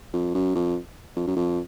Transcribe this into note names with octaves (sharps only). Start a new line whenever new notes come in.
F2
F#2
F2
F2
F#2
F2